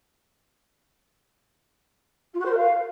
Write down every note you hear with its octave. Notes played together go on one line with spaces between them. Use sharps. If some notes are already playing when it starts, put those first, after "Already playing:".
F4
F#4
C5
A#4
F5